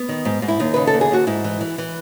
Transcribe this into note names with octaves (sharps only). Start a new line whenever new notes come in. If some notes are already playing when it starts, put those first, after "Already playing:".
Already playing: B3
D#3
G#2
G#2
E4
D#2 D#4
C#3 B4
A4
D#2
G#4
D#2 F#4
G#2 E4
E3
E3
E3